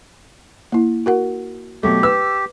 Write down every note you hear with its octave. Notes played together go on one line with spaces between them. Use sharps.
A#3 E4
F#4 A#4 F#5
B2 F#3 A3 G4
B4 E6